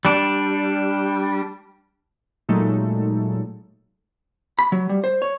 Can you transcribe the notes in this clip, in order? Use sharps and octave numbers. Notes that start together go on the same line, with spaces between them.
G3 D4
A#2 F#3 G#3 A3 D#4 A4
B5
F#3
G3
C5
C#5